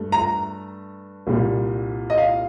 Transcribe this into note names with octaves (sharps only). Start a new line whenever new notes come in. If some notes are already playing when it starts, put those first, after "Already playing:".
Already playing: G2 A3
A#5
C2 A#2 G3
D#5
F5